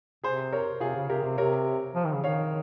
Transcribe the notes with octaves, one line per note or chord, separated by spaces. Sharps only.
C3 G#4 C5
A#4 C#5
C3 F4 G#4
C#3
C3 G4 A#4
C#3
C3
C3 A#4 C#5
F3
D#3
C#3
D#3 C#5 F5